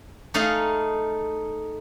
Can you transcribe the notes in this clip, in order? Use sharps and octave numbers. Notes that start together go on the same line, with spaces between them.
A3 D#4 G#4 D#5 F5 A#5